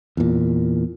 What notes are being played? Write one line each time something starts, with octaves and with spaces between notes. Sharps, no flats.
E2 A#2